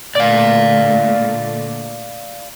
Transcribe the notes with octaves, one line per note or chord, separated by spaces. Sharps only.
A#2 D3 A3 D5 F5